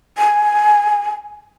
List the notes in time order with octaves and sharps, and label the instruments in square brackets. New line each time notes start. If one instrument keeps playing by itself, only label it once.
[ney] G#5